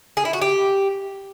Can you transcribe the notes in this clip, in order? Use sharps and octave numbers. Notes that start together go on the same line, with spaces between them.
G#4
E4
F#4
G4